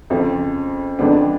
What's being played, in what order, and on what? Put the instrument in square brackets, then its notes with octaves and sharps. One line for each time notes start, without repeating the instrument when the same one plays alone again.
[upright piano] F2 C#3 F3
F2 F3 G#3 B3 D4